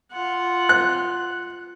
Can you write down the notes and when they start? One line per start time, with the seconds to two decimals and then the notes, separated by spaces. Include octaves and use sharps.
0.12 F4 F#5
0.69 F#6